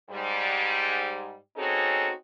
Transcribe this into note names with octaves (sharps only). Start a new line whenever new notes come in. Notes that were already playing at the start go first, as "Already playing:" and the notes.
G#2 G3
C4 C#4 D#4 F#4 G#4 A4